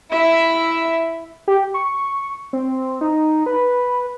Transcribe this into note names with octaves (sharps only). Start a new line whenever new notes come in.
E4 E5
G4
C#6
C4
D#4
B4